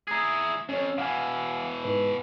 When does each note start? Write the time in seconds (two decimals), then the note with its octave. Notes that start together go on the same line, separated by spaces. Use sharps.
0.08 E4 G#4 A#5 D#6 G#6
0.69 F2 C#4 C#5
0.98 B2 E3 F5 F#5 G#5
1.84 G#2 B4